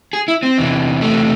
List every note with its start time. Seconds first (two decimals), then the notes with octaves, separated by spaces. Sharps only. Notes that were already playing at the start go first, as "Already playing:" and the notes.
0.13 G#4
0.28 E4
0.43 C4
0.58 E2 C3 E3
1.01 A3